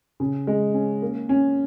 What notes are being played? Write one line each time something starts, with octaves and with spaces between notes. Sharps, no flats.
C#3
G#3
C#4
A#3
C#4